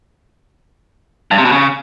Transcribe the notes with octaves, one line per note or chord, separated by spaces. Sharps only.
G2
C3
B2
C#3